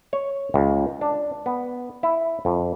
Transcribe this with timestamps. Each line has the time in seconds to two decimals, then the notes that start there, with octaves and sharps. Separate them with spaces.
0.13 C#5
0.54 C#2
1.01 D4
1.46 B3
2.03 E4
2.45 F2